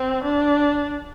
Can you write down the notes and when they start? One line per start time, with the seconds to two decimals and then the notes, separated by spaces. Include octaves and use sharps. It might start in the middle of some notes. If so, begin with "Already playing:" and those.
Already playing: C4
0.24 D4